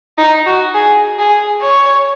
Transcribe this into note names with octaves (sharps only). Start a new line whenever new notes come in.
D#4
F#4
G#4
G#4
C#5